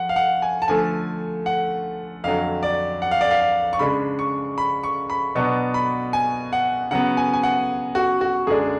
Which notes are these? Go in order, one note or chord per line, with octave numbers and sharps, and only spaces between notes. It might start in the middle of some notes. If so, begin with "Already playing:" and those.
Already playing: F3 F#5
F5
F#5
G#5
A5
D3 F3 A3 G#5
F#5
F2 D3 F#3 F5
D5
F#5
F5
D5
F5
F5
C#6
C#3 G#3 D4 B5
C#6
B5
C#6
B5
B2 F#3 B3 D4 C#6
B5
G#5
F#5
C#3 F#3 B3 F#5
G#5
G#5
F#5
F#4
F#4
F#2 D3 G#3 D4 G#4